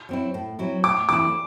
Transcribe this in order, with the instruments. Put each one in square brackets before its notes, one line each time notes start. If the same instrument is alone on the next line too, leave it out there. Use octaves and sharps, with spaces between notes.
[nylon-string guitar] F#3 C4 E4
A2
F#3 C4 E4
[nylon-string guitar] A2 [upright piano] D6
[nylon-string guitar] E3 A3 C4 E4 [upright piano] D6